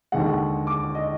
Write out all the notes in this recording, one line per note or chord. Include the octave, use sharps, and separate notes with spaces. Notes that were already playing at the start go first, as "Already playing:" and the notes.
D#2 D3 G#3 F#5
D6
D#5